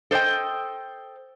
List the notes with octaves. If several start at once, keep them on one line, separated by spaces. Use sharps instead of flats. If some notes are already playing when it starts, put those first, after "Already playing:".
A4 C5 D5 D#5 G5